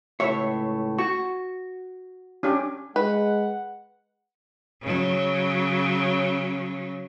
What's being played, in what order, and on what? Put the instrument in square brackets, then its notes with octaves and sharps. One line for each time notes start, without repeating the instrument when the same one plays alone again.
[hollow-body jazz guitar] C#2 A2 C#5 [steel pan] E5
[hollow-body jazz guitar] F#4 [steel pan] C#6
[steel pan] C#4 D4 G4
[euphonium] G#3 [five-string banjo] B4 [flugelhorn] F#5
[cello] C#3 F#3